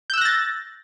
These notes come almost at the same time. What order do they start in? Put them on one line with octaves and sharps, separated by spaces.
G6 E6 F#6 A#6 A6